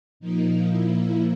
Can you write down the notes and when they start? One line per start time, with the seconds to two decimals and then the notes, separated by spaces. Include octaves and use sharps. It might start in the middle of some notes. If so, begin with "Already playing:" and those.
0.20 A#2 F3 A#3 D#4
0.69 E4